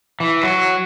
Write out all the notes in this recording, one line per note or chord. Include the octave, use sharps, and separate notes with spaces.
E3
F#3